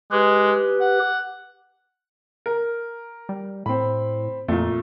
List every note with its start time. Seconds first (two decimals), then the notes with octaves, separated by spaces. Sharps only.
0.12 G#3 G4 B4
0.81 F#5
2.46 A#4
3.29 G3
3.66 A2 C4 B5
4.48 F2 A#2 A3